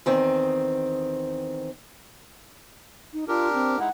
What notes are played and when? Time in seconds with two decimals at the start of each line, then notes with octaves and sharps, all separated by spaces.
0.06 E2 D#3 C4
3.13 D#4
3.28 D4 F4 G4 A#4
3.54 C4
3.79 G#3 D#4 E4 F#5